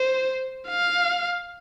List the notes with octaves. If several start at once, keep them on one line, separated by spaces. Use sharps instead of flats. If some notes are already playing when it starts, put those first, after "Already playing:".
Already playing: C5
F5